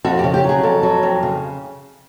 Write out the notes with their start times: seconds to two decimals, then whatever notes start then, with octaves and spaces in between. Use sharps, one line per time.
0.04 F2 F#4
0.19 G4
0.24 C#3
0.34 G4
0.44 F#3
0.49 G#4
0.63 F2 A4
0.83 F#3
1.03 F2
1.23 C#3